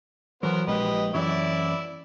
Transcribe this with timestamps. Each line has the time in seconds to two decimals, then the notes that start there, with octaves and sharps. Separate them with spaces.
0.43 E3 F#3 B3 A#4 C5
0.67 A#1 G#3 G4 B4 D#5
1.14 F#2 E3 F#3 E4 D5 E5